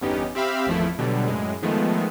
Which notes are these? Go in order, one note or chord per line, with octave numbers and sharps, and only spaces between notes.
G1 E2 B3 C#4 D#4 G4
C4 G4 E5 F5 B5
G#1 E2 F3 A3 E4
B2 D3 F#3 G3
F#2 A2 G#3
D#3 F3 G#3 A3 B3